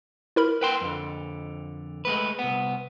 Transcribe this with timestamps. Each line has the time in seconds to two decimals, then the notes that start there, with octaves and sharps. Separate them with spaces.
0.36 E4 A#4 B5
0.61 B4 G5 C6
0.81 F2 D3
2.05 G#3 A3 B4
2.39 C2 B3